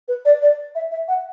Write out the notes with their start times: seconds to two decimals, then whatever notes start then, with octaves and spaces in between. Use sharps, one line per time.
0.08 B4
0.25 D5
0.42 D5
0.75 E5
0.91 E5
1.08 F#5